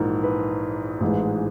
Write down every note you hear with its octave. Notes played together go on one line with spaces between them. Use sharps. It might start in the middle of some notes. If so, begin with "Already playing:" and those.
Already playing: A#1 G#2 E3 A#4
B4
A1 G#2 E3 G#3